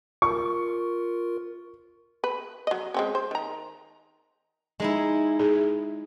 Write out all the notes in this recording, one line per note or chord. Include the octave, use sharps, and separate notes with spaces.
F4 A#4 C#6
B4
F#3 D#5
G#3 C4 C#4
C5
D#3 A#5
G#3 D#4 E4
G#4